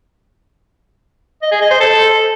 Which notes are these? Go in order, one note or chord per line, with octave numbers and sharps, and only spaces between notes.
D#5
G#4
D#5
C5
A4